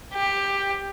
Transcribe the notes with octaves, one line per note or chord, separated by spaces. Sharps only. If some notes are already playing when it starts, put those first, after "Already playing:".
G4